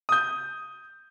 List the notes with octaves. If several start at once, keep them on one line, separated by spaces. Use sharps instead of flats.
D#6 G6